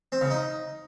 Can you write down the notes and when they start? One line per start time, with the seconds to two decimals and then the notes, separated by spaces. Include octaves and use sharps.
0.12 C4
0.21 C#3
0.30 D#4